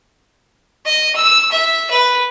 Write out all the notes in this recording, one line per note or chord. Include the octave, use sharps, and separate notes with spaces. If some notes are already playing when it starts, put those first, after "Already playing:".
D#5
E6
E5
B4